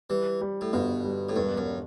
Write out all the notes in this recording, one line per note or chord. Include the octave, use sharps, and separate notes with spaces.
E3 G3
G3
A2
G1 B2
G3
A2
E1 G2
F#2